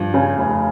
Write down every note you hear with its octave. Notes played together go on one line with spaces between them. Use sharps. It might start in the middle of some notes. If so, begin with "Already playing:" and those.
Already playing: G2 F3
C#3
F1